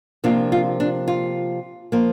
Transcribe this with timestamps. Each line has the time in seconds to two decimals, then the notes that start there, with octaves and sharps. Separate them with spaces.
0.24 C3 F3 A#3 D4 F4
0.52 F4
0.80 D4
1.08 F4
1.92 F3 A#3